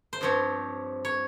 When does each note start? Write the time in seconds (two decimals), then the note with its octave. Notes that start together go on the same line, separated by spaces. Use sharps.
0.13 C5
0.21 G2 F3 C4 C#5
1.05 C#5